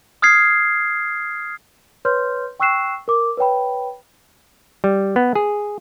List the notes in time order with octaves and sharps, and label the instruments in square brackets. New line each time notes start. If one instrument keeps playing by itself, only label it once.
[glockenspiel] D#6 F6 G#6 C7
[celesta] B4 C#5 C6 F6 G6
G5 C#6 E6 F#6 C7 E7
A#4 D6
B4 C#5 G5 B5
[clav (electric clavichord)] G3
B3
G#4